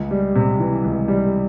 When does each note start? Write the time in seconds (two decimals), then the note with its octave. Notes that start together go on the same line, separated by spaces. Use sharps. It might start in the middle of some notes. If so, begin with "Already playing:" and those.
Already playing: C#2
0.11 G3
0.35 C3
0.60 E3
0.84 C#2
1.08 G3